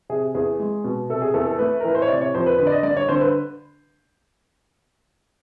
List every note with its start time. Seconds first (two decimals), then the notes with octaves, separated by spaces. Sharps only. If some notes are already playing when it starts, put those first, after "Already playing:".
0.09 C3 G#4
0.35 E2 G#4
0.60 G#3
0.84 B2
1.10 C3 A4
1.22 G#4
1.34 E2 A4
1.46 A4
1.59 A3 B4
1.80 A#4
1.85 E3 B4
1.95 C5
2.02 C#5
2.08 C3 D5
2.21 C#5
2.34 F2 C5
2.46 B4
2.58 D3 B4
2.67 D5
2.72 D#5
2.83 G2 D5
2.97 C#5
3.09 D3 C5
3.21 B4